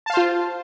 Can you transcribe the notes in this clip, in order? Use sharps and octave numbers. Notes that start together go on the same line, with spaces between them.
F4 C5 F5 A5